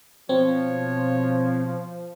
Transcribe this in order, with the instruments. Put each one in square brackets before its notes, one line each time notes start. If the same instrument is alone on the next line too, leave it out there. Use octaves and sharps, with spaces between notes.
[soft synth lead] B2 [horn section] F3 [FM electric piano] C4 [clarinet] C#5